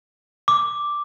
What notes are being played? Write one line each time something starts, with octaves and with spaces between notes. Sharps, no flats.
D6